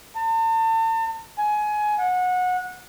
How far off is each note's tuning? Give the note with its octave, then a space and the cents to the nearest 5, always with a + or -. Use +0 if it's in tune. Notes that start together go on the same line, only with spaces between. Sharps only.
A5 +40
G#5 +20
F#5 -25